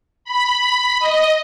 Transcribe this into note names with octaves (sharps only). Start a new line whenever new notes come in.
B5
D#5